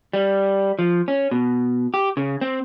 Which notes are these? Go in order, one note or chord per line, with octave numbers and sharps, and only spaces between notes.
G3
F3
C#4
B2
G4
C#3
C4